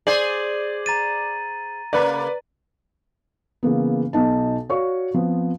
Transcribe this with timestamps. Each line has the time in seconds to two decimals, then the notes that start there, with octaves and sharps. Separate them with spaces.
0.07 G#4 C5 D5 F#7
0.86 A#5 A6 D#7
1.93 C#3 A#3 B4 D5
3.63 C#3 E3 A#3 B3
4.13 B1 B2 D#4 A5
4.69 F#4 C#5 D5 F5 C#6
5.14 F3 B3 C4